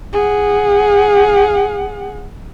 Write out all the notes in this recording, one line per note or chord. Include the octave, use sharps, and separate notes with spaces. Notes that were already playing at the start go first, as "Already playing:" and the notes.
G#4 F#5